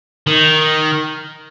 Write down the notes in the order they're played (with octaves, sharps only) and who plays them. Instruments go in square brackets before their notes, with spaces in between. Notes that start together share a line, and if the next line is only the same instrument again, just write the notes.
[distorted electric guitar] D#3